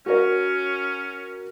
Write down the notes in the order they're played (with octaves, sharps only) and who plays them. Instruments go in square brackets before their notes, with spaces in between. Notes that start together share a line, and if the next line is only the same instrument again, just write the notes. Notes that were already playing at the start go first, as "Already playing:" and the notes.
[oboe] C#4 [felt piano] F#4 A#4 C#5